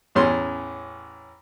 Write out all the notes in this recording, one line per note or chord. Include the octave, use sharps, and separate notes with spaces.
A1 E2 C#4 C6